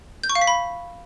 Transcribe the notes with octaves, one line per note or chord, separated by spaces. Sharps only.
G6
C#6
F5
B6
B5